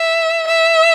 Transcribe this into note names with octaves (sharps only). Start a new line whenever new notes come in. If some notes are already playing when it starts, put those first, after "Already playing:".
Already playing: E5
E5